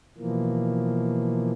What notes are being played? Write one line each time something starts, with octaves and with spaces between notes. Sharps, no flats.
B2 E3 F3 A#3